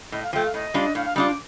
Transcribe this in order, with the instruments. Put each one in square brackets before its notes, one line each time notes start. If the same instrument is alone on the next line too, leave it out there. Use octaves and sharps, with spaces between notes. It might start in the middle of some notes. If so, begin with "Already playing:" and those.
[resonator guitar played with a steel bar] A2 [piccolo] D#5
[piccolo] F5
[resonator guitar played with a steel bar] F3 A3 [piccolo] G5
[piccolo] F5
[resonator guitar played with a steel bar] A2 [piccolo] D#5
[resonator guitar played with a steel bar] G3 D4 F4
[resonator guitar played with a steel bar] A2 [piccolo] F5
[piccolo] F5
[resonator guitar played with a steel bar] G3 D4 F4 [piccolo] D#6
[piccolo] D6